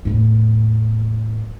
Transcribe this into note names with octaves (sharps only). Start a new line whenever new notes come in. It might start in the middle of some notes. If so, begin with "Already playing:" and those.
E2 A2